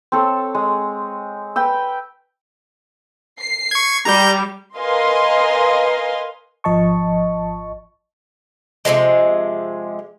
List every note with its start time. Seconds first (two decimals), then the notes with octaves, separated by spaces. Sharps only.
0.12 C4 A4 C#5
0.55 G#3
1.56 B4 G5 E6
3.39 C7
3.71 C#6 G#6
4.05 G3 A#5 G6
4.77 A#4 B4 D#5 F5 G#5 C6
6.64 G#1 F3 D#5 A5 C#6
8.85 C3 D#3 F3 G#3